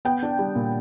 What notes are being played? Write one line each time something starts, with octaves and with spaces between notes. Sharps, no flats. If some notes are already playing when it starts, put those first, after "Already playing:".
B3 G5
D4
G3
A#2